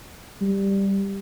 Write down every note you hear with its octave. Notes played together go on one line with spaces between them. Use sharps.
G3